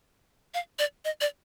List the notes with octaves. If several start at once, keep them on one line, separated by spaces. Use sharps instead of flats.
F5
D5
D#5
D5